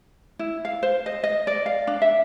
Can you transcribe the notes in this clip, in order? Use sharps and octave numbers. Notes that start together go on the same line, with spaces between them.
E4
F5
C5
D#5
D#5
D5
F5
D4
E5